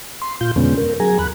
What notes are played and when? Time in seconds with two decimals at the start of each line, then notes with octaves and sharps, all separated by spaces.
0.22 C6
0.41 A#2 F4 G6
0.56 F2 B2 D3 G#3 B3 C#4
0.77 A#4
1.00 F#3 G#4 G#5 A#5
1.19 E2 B5 F#6